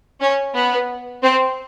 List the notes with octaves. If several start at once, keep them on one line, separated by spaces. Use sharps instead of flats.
C#4
B3
C4